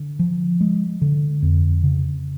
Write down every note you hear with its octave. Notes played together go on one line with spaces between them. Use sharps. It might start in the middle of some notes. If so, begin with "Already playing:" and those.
Already playing: D3
F3
G#3
D3
F2
C#3